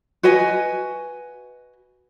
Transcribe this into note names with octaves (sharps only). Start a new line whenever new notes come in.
F#4 B4 D#5 G#5